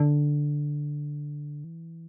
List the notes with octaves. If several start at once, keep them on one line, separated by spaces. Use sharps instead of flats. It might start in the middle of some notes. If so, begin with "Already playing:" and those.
Already playing: D3
E3